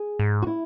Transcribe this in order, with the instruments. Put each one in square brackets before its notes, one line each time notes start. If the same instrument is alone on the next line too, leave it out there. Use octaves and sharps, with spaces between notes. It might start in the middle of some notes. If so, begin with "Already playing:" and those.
Already playing: [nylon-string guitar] G#4
[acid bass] G#2
[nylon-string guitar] F#4
E4